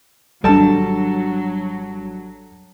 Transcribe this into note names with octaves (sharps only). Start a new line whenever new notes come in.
G#1 F#3 G3 D4 A4 A5